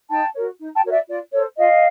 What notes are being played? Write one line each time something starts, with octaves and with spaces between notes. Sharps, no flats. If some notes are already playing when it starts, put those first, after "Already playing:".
D#4 G5 A5
F#4 A#4 C#5
D#4
G5 A5
F#4 A#4 C#5
D5 E5
F4 D5
A4 C5 C#5
F4 D#5 F5